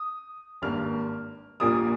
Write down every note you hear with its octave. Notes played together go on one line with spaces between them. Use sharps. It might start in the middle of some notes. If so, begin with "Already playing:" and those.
Already playing: D#6
G#1 G2 G3 A#3 F6
A#1 A#2 G3 A#3 D#6